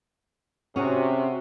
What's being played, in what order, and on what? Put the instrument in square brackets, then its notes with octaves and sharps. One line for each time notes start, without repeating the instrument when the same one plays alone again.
[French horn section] C3 [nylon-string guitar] C#4 G#4 [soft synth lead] F#4